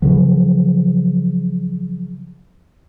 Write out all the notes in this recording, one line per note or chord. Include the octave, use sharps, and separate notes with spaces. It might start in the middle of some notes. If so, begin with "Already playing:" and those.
C#3 F3 F#3